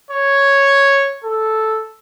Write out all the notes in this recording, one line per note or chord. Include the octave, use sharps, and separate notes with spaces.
C#5
A4